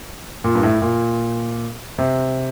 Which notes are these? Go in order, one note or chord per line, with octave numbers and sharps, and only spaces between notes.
A#2
G2
A2
A#2
C3